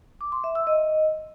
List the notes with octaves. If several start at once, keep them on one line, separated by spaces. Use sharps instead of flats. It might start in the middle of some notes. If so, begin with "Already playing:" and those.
D6
C6
E5
E6
D#5